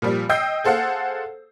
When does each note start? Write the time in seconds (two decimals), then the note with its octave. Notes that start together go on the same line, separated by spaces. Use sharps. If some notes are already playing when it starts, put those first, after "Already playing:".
0.02 A#2 F3 G3
0.29 D#5 G5 E6 G6 C7
0.64 G#4 A4 C5 F5 F#5